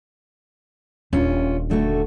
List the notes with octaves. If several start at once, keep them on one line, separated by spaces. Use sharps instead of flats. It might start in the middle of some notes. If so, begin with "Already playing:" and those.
D#1 C#4 D4 F4
D3 A3 F#4